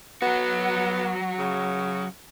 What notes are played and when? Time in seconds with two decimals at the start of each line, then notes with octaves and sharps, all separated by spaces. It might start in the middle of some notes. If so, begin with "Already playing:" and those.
0.22 F#3 B3 F#4
1.39 C#3